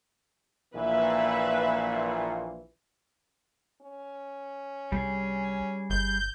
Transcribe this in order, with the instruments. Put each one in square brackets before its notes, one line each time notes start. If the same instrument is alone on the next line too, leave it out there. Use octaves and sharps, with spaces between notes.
[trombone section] A#1 A#2 E3 [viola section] B4 E5
[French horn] C#4
[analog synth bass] C2 [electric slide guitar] G3 G#4
[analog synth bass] G1 [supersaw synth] G6